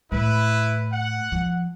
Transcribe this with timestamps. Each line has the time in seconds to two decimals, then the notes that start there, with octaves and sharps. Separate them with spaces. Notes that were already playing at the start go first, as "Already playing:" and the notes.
0.12 A2 E4 B4
0.91 F#5
1.32 F3